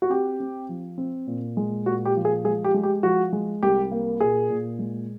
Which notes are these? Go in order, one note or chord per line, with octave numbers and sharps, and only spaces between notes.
F#4
C4 G4
C4
F3
C4
A#2
G#3
A#2 F#4
G4
F3
G#4
G#3 G#4
G4
G#3
G4
F3 F#4
G#3
C2 G4
A#3
A#2 G#4
A#2
G#3